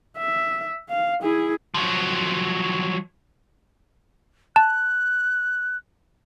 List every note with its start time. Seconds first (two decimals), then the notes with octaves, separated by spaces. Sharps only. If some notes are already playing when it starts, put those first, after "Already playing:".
0.18 E5
0.89 F5
1.22 E4 G#4
1.74 F3 F#3
4.56 A5 F#6